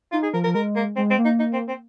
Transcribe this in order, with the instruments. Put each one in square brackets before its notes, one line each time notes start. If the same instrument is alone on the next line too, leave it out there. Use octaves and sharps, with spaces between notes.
[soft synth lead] D#4 [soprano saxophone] F4
[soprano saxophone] G#4
[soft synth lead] F3 [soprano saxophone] A#4
[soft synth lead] F3 [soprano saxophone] A#4
[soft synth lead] G#3 [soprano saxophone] A#4
[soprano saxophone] A#3
[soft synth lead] G#3 [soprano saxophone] C4
[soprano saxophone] C4
[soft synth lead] A#3
[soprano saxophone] D#4
D#4
C4
C4